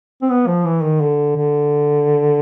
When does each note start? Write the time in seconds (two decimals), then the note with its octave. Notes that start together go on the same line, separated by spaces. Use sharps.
0.22 C4
0.30 B3
0.47 F3
0.66 E3
0.83 D#3
1.01 D3
1.37 D3